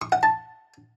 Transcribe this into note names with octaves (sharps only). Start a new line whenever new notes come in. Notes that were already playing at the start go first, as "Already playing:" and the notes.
C#6
F#5
A5